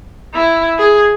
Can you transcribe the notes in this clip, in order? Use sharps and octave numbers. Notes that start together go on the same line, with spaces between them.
E4
G#4